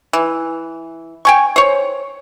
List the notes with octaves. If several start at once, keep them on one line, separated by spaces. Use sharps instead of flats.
E3
G5 G#5 C#6
C5 C#5